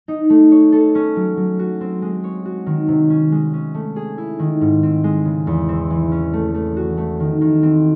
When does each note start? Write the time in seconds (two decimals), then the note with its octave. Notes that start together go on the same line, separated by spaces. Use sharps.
0.08 D#4
0.30 A3
0.51 C#5
0.72 A4
0.95 C#4
1.16 F#3
1.37 F#3
1.59 F#4
1.81 C4
2.02 G#3
2.24 C#5
2.45 F#4
2.66 D#3
2.88 C3
3.10 C#4
3.32 G#3
3.53 C#4
3.74 A3
3.96 G#4
4.18 E4
4.39 D#3
4.61 G#2
4.83 C4
5.04 G#3
5.25 C#3
5.47 E2
5.69 C4
5.90 E3
6.11 C#4
6.33 A3
6.54 A3
6.76 F#4
6.98 A3
7.20 D#3
7.41 D#3
7.63 C4